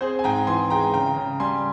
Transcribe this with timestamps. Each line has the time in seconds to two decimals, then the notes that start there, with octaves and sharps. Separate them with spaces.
0.01 C4 G#4 C5
0.19 G#5
0.24 G#2 G5 A#5
0.47 E3 G#5 C6
0.70 G#3 G5 A#5
0.94 C#3 G5 A#5
1.17 C#3
1.40 G3 G#5 C6